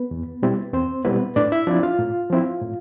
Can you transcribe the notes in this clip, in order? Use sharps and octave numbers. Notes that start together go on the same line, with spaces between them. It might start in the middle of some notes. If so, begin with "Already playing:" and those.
Already playing: B3 B4
E2
B2 G3 C4 E4
E2 C4 C5
B2 G3 B3 C4 E4 B4
A2 D4 D5
E4 E5
F3 C4 D4 E4 D5
F4 F5
A2
F3 C4 E4
A2